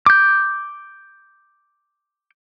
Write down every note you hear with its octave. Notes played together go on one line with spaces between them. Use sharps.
D6 G6